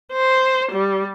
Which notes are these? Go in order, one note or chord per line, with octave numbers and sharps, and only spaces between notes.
C5
G3